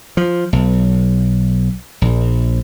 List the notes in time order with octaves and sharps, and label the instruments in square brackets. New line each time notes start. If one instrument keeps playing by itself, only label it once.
[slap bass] F3
B1
A#1